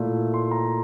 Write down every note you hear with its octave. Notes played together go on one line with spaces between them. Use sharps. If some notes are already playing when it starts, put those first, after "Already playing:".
Already playing: A#2 A3 E4
C6
A#5